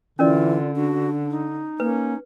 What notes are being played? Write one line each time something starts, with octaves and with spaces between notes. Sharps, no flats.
D3 E3 C#4 F4 A#4 D5
D4 F#4
D#4
A#3 C#4 B4